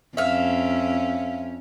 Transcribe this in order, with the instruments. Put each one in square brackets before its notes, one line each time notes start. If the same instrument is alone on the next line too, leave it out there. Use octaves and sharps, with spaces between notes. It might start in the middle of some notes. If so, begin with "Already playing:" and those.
[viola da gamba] F2 C#4 [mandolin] E5 F5